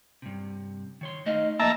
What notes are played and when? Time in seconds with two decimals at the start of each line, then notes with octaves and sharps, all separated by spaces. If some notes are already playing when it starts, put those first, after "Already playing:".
0.22 G2 C3
1.01 D#3 C#5 C6
1.26 A3 D#4 D#5 F5
1.59 F3 A#3 D#5 E5 A5 A#5